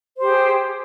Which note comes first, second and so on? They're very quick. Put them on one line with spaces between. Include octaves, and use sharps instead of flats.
C5 G4 G#4